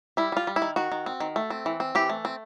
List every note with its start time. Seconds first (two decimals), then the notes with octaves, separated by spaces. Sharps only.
0.17 G3 E4
0.32 G3 F4
0.47 G3
0.56 E4
0.62 D#3
0.76 D#3 F#4
0.92 D#3
1.06 C4
1.20 D#3
1.36 A3
1.50 C4
1.66 E3
1.80 C4
1.95 E3 G4
2.09 A3
2.25 C4